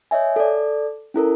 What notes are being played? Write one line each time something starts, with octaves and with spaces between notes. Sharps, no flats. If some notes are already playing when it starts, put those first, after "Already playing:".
C#5 D#5 E5 G#5
A4 D5
C#4 E4 A4 A#4